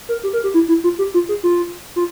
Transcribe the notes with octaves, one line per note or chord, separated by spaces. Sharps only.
A#4
G4
A#4
G4
E4
E4
F4
G4
F4
G#4
F4
F4